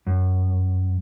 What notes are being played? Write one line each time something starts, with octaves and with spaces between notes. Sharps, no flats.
F#2